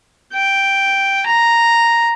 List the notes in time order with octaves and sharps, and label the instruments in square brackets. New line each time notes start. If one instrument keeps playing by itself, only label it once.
[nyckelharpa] G5
A#5